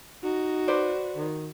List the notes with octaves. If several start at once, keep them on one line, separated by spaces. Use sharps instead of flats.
D#4 F#4
B4 C5 D5
D#3